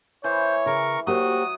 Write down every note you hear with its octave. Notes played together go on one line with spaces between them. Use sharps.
E3 C5 C#5
C#3 A#4 C#6
F#3 A#3 F#4 G4 C5 D#6